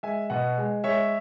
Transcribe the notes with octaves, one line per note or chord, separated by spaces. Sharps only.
G#3 E5 G#5
B2 D#5 F#5
G#3
G#3 C#5 E5